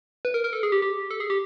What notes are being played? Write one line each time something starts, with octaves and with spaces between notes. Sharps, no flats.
B4
A#4
A#4
A4
G#4
G4
G4
A4
G#4
G4